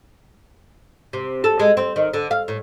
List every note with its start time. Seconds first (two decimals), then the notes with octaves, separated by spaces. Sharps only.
1.13 C3
1.44 A4
1.59 G#3
1.77 C4
1.96 D#3
2.14 D3
2.31 F5
2.48 A2